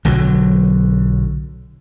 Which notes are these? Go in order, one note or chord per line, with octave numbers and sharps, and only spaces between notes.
B1 D3 F#3